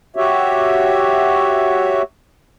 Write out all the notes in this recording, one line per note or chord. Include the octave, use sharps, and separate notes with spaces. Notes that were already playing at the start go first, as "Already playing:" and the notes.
F#4 G4 C#5 E5